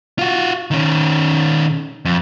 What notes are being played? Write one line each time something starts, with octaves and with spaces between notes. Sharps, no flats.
F4 F#4
D#3 C#4
F2